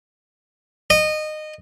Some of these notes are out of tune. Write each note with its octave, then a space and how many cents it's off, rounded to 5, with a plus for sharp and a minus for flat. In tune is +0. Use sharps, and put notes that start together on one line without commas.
D#5 -20